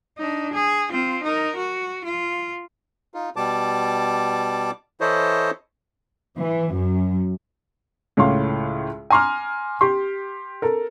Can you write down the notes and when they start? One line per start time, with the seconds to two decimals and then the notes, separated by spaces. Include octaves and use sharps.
0.18 D4 D#4
0.53 G#4
0.91 C4 F4
1.24 D#4 A#4
1.56 F#4
2.05 F4
3.14 D#4 F4
3.36 B2 G3 A5 D6
5.01 E3 E4 A4 C5 C#5 D#5
6.39 E3
6.75 F#2
8.17 C#2 A2 C#5 F5 C6
9.10 G#5 A#5 C6 D6 F6
9.81 G4 C6
10.62 A4 A#4